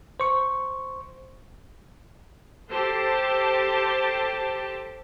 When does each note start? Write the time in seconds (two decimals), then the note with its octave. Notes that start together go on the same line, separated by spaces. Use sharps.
0.20 C5 C#6
2.70 G4 A4 C5 A5